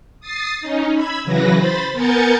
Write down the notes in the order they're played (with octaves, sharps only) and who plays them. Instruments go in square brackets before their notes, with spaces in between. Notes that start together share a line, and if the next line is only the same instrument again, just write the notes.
[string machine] D#6 A6 C7
C#4 D#4
B5 E6 G#6
C#3 E3 F#3 B4 A#6
C5 B5 A6
B3 A#4 G#5 G6 A6 C#7